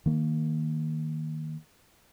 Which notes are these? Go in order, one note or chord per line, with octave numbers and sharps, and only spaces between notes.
D#3 A#3